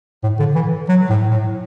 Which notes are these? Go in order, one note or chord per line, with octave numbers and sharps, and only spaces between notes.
A2
D3
E3
F#3
A2
A2